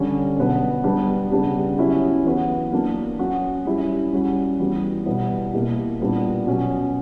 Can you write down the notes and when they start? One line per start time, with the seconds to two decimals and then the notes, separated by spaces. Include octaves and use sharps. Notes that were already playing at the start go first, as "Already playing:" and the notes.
Already playing: D3 G3 C#4
0.37 B2 F#3 B3 D4
0.84 G3 B3 D4
1.31 C#3 G3 B3 D4 G4
1.78 F#3 C#4 E4 G4
2.24 E3 B3 F#4
2.72 F#3 A#3 D4
3.19 F#3 C#4 F#4
3.65 G3 C#4 E4 G4
4.13 G3 C#4 F#4
4.60 E3 G3 B3 F#4
5.06 B2 G3 B3 E4 G4
5.53 B2 A#3 E4 G4
6.00 A#2 G3 B3 D4
6.47 B2 F#3 C#4